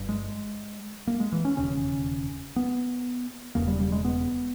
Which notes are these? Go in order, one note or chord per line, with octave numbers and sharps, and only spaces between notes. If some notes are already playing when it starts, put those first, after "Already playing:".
Already playing: G1 G2
G#3
A#3
G#3
E3
C#4
E1 D#2 C#3 C#4
B3
E1 E2 C#3 A#3
G3
G3
G#3
B3